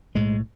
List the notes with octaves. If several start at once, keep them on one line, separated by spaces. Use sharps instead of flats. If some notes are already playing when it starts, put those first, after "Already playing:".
B1 A2 G#3